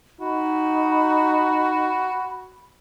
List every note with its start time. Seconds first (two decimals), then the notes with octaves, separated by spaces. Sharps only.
0.21 D#4 F#4 B5